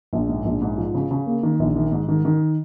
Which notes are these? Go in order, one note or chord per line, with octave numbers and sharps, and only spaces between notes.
A#1
G#2
A#1
G#2
F3
C#3
C#3
A#3
D#3
A#1
D#3
G#2
D#3
D#3